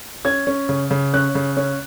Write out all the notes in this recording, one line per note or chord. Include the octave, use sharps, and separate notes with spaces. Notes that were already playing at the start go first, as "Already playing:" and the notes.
C#4 G#6
C#4
C#3
C#3
C#4 F#6
C#3
C#4